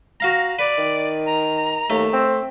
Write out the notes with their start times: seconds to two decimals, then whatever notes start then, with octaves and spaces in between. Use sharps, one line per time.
0.20 F#4 F5 A#5
0.59 B4 D5
0.78 D#3
1.26 A#5
1.90 D#2 A3
2.13 C4 E6